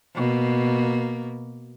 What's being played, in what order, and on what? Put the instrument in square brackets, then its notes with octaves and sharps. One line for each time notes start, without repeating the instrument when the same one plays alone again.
[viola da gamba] B2 A#3